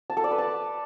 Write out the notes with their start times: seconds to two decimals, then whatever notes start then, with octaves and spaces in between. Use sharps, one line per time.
0.10 A5
0.17 A4
0.24 D5
0.31 B4
0.38 A5